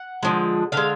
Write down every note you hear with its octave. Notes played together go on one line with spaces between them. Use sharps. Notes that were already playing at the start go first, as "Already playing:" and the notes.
Already playing: F#5
D3 F3 G#3
D3 G#3 F5